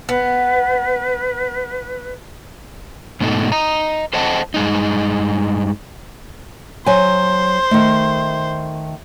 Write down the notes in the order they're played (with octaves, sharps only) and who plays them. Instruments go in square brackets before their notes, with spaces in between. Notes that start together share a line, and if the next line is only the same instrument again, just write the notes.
[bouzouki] B3 [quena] B4
[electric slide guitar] G#2 B2 A3 D#4
D#5 A#5
A4 C5 D#5 F#5 A5
G2 G#3 D#4
[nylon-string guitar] F#3 G#5 [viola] C5
[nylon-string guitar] D#3 A3